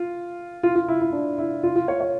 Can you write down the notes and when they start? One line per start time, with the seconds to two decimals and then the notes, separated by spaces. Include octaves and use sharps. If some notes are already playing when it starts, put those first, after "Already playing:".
Already playing: F4
0.63 F4
0.75 F4
0.88 E4
1.01 E4
1.13 D4
1.38 E4
1.63 F4
1.76 F4
1.88 C#5
2.01 C#5